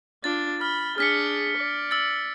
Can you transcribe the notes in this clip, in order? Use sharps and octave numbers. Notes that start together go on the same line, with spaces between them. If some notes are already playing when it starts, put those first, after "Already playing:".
D4 F4 A6
B5 F6
D4 G#4 F6 B6 C#7
D5
E6 A6